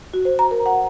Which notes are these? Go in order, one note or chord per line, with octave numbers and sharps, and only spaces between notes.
F#4
C5
A#5
A#4
F#5